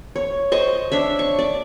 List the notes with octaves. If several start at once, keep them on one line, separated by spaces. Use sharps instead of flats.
C#5
C5 D#5 C#6
D4 C#5 E5
C#6
D5